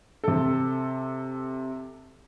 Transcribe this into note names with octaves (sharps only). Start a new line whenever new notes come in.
C3 A4